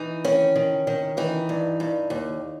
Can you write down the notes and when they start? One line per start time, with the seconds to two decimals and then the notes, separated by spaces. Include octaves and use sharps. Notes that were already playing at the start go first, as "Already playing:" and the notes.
Already playing: E3 D#4
0.25 D#3 C#4
0.55 D#3
0.87 D#3
1.17 E3 D#4
1.49 G2
1.80 G2
2.10 D#2